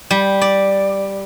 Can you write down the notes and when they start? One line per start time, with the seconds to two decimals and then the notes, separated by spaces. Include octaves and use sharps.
0.11 G3
0.41 D5